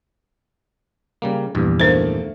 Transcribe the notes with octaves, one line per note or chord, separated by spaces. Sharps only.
C#3 G3 A#3
A#1 E2 G2
D#3 A3 A#3 D4 C5